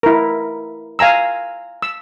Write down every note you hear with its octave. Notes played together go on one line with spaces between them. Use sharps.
E4 A#4
F5 G#5 A#5 E6
E6